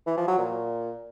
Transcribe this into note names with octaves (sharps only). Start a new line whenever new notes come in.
E3
F3
F#3
A#2